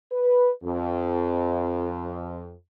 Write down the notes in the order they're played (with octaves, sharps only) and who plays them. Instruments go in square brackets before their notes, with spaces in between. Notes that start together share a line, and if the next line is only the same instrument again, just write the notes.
[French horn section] B4
F2